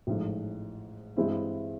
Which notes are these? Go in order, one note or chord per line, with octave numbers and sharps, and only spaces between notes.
A1 G#2 F3 A3
G2 E3 G#3 C4 E4